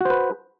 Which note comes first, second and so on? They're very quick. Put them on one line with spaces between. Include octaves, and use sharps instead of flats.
F#4 C5 B4